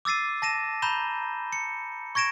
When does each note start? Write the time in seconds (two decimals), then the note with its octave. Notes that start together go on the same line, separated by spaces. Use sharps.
0.05 D6 E6 A6 C7 D#7
0.42 A5 A#6 D#7 E7
0.82 A#5 B5 G6 E7 G7
1.53 C#7
2.15 C#6 G#6 A#6 D7 E7